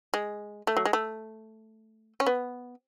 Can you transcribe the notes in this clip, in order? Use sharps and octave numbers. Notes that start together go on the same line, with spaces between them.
G#3
A3
F#3
G#3
A3
C#4
B3